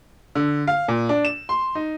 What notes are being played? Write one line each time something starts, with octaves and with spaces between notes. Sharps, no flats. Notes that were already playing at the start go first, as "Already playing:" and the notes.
D3
F5
A#2
D4
E7
C6
D#4